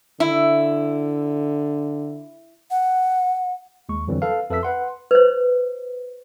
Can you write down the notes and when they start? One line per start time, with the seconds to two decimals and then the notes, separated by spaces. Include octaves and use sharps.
0.20 D3 E4
2.71 F#5
3.89 D#2 G#3 C#6
4.08 F2 D3 E3 F#3 G3 C4
4.22 A4 B4 F5
4.49 F2 A4 B4 E5 E6 B6
4.63 B4 F#5 C6
5.11 B4 C5